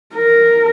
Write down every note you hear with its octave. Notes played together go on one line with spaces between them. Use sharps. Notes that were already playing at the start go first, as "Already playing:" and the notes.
A#4